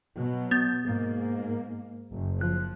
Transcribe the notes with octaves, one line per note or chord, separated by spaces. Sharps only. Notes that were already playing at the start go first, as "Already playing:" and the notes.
B2 F#3
B3 G6 A6
G#2 A#3
F#1
F3 F#6